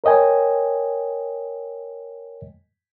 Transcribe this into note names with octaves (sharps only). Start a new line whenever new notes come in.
A#4 C#5 D#5 G5 G#5